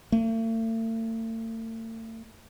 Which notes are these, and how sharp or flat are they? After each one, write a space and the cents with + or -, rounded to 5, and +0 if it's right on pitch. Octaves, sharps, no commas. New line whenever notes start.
A3 +40